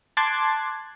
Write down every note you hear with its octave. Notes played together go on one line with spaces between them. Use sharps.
A5 C6 D6 F#6 G#6 A6